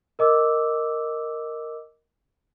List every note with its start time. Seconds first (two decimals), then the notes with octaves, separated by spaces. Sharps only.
0.19 A#4 D#5 D6 E6